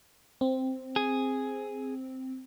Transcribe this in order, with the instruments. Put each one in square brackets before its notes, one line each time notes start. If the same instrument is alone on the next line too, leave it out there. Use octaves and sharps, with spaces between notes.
[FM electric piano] C4
[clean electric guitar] G#4